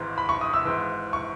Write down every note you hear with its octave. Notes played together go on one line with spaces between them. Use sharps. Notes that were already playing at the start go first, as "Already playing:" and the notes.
Already playing: G#1 G#2 E3
B5
C#6
D#6
E6
G#1 G#2 E3
C#6